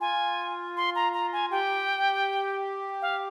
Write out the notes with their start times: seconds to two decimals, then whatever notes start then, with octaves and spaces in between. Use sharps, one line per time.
0.01 F4 G#5
0.77 C6
0.95 A#5
1.14 A#5
1.33 G#5
1.51 G4 G5
3.02 F5